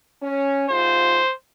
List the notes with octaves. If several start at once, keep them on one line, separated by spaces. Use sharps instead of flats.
C#4
G#2 C3 F4 C5